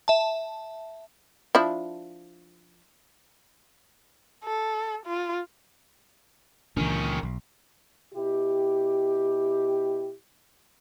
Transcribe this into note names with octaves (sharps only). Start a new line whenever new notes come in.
E5 A5
F3 D4 E4
A4
F4
C#2 A#2 D#3 E3 C#4 D4
B1
B2 E4 G4